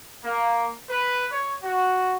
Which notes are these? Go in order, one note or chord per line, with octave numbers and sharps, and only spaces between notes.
A#3
B4
C#5
F#4